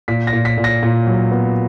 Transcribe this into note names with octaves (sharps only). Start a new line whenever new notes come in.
A#2 B6
A#6
A#2
B6
A#2
A#6
A#2
F#3
B3